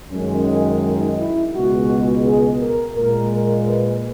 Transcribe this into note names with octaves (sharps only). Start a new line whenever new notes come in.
F#2 D#3 G#3 C#4
D#4
E4
C#2 B2 G#3 F#4
G#4
A#4
A#2 G#3 A#4
A#4
B4